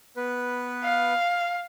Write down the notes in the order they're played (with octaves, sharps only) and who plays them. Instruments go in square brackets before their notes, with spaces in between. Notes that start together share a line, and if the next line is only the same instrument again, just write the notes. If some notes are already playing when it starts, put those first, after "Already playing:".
[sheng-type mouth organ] B3 B4
[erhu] F5